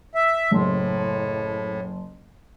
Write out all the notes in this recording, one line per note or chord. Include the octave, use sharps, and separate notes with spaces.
E5
F#1 A2 C6